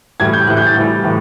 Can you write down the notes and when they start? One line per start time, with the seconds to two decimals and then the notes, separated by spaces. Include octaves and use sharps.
0.20 A2 E3 G3 G#6
0.33 G6
0.47 A2 E3 G3 F#6
0.57 G6
0.67 A6
0.76 A2 E3 G3
1.04 A2 E3